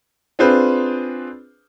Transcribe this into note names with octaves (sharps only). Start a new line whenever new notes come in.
C4 D4 F4 G#4 B4 C5